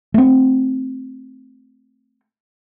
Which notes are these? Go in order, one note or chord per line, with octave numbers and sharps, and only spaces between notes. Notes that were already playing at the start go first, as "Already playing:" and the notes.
A3 C4